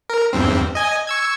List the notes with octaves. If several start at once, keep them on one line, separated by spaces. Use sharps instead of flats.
A#4
E2 G2 C4
D#5 G#5
C#6 E6 G#6